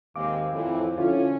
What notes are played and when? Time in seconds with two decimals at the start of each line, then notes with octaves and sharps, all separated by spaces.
0.16 D#2 G#2 G#3 C4 F5 D6
0.53 F2 A2 E3 C4
0.98 D3 C#4 E4 F4